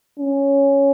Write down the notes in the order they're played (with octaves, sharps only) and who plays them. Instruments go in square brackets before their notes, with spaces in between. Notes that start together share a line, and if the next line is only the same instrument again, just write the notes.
[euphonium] C#4